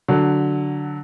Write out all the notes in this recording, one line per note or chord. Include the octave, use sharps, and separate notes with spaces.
D3 F#3